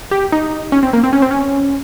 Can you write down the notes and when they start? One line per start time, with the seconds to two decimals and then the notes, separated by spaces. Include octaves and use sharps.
0.11 G4
0.32 D#4
0.72 C#4
0.83 C4
0.93 A#3
1.04 C4
1.13 C#4
1.22 C4
1.31 C#4